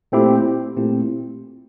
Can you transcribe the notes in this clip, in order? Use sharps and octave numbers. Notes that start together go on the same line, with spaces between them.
A#2 A3 C4 E4 G4
A#2 A3 C4 E4 G4